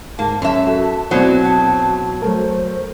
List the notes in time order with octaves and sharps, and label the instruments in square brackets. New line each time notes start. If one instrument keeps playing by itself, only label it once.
[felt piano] G#2 [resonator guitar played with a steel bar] A#3 [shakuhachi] A5
[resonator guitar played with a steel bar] F#2 E5 [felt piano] C#4 [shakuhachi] A5
[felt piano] F#4 A4
[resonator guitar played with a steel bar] B2 F#3 [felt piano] C4 E4 C5 [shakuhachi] D5
[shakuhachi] A5
[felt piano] F#3 A3 A#4 [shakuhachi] C5